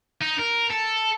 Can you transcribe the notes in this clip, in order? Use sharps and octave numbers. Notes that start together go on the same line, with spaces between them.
D#4
A#4
A4